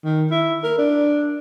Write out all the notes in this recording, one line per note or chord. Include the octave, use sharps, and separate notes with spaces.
D#3
E4
A#4
D4